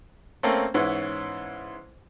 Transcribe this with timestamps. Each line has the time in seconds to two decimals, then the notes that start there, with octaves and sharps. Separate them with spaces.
0.43 A3 A#3 C4 C#4
0.74 G#2 E3 B3 C#4 E4